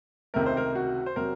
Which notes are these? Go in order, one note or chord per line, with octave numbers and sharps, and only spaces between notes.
C#2 C3 D#3 A3 A#4
C5
A#4
F#4
C5
C3 F#3 A#4